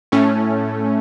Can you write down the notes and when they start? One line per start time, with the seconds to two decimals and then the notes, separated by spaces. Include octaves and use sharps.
0.12 A2 A3 C#4